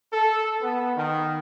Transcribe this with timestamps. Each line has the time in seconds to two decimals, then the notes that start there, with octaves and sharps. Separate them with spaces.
0.13 A4
0.62 B3
0.97 D#3